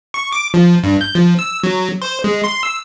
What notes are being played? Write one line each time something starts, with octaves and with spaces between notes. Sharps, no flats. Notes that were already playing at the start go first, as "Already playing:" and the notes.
C#6
D6
F3
G2
G6
F3
E6
F#3
C5
G#3
C6
E6